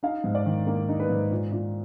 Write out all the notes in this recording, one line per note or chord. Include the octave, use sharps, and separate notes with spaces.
D#4 F5
G#2
D5
D#3
A#3
D#4
B4
G#2
A#2
A#2